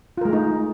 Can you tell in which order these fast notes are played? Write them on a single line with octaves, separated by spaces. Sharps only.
F4 A#4 G#3 A3 D#4